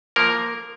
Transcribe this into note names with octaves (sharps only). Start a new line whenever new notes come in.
F3 A#3 A#4